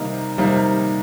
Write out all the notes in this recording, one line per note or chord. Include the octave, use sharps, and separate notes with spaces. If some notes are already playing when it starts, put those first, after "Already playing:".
Already playing: C3 D#3 G3 A#3 D#4
C3 D#3 G3 A#3 D#4